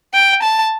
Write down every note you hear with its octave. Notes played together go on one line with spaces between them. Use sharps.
G5
A5